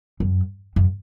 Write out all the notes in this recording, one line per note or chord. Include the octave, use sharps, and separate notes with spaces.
F#2
F#2